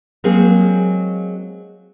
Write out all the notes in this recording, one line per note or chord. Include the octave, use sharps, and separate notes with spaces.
F#3 G#3 A#3 C4 G#4